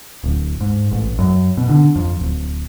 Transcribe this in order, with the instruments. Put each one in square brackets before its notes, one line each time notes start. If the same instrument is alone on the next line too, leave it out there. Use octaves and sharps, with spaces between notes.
[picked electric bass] D1
G#2
A1
F#2
B2
D3
F2
D1